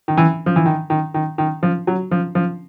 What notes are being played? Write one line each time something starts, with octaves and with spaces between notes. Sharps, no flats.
D#3
E3
F3
E3
D#3
D#3
D#3
D#3
F3
F#3
F3
F3